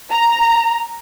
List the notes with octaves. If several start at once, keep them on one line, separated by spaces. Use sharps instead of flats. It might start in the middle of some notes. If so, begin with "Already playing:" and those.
A#5